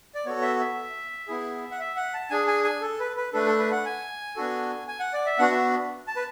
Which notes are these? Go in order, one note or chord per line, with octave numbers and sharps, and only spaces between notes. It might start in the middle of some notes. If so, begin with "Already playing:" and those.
D5
B3 F#4 A4 C#5
E5
E5
B3 E4 G#4
F#5
E5
F#5
A5
D4 G#4 G#5
G#5
G#5
A4
B4
B4
A3 D4 A4 B4
A4
B4
F#5
G#5
B3 D4 F#4 A4
G#5
F#5
D5
E5
B3 D4 F#4 F#5
E5
A5
B4